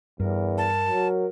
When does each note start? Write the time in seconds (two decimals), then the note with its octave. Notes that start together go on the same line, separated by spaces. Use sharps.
0.20 E2 G2 A#4
0.58 A5
0.88 F#3